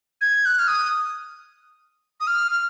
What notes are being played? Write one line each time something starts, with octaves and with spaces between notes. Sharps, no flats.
G#6
F#6
F6
D#6
D#6
F6
F6